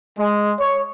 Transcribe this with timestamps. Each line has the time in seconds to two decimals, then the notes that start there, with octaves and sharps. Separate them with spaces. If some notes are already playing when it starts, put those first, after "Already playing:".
0.18 G#3
0.60 C#5